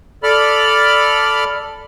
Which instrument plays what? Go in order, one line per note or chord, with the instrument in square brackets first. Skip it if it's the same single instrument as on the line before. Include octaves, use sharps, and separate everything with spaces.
[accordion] A4 D5 B5 F6